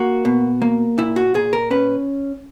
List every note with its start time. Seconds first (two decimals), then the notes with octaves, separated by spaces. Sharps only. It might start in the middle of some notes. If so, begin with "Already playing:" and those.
Already playing: A#3 F#4
0.25 B2
0.62 A#3
0.98 A#2 E4
1.16 F#4
1.34 A#2 G#4
1.53 A#4
1.71 C#4 B4